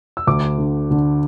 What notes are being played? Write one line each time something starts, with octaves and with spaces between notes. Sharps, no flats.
E6
D2 D6
D3
D3